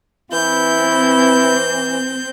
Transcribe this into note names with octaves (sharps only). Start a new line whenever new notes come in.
E3 C4 E4 G6